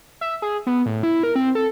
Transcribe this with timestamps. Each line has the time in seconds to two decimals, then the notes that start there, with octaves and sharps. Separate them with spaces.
0.21 E5
0.42 G#4
0.67 B3
0.86 A2
1.03 E4
1.23 A#4
1.36 C4
1.55 A4